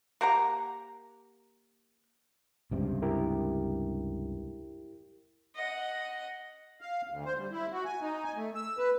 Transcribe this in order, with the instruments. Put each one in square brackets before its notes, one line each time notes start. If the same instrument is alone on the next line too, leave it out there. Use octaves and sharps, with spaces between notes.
[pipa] A#3 G4 F#5 A#5
[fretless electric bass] C#2 G2 C3
[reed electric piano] E4 G4 A#4
[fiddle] D#5 F#5
[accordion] F5
D2
C5
G3
E4
F#4
G#5
D#4
G#5
A3
E6
B4